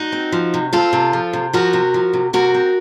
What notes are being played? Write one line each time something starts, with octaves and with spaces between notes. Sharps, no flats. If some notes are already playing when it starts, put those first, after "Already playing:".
Already playing: D#4 F#4
C4
F3
C3
C4 F4 A4
C3
F3
C3
F3 F#4 A#4
C3
F3
C3
C3 F#4 A#4
C4